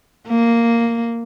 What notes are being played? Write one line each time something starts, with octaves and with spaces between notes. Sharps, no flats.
A#3